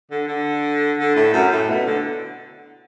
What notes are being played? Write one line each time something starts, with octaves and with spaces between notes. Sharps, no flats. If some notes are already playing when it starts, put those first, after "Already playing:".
D3
D3
D3
A2
F#2
A2
B2
D3